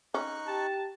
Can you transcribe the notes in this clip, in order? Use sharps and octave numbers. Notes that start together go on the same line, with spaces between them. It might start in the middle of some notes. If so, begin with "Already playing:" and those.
C#4 D#4 C#6 F#6
G4 A5